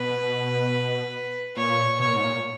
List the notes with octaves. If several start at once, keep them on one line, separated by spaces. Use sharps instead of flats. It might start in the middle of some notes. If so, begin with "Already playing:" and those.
Already playing: B2 B4
A#2 C#5
B2 C#5
A#2
G#2
A#2